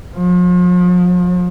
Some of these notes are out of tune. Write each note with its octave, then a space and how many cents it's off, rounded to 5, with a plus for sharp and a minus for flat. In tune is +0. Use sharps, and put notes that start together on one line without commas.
F3 +40